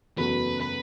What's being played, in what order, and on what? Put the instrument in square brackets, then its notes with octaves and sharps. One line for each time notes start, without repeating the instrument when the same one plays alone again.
[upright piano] F#1 E2 B2 A3 F#4 [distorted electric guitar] B4
[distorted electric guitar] B4